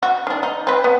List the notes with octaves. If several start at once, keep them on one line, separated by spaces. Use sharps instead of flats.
F#4
D#3 D4
D#4
C4 B4
B3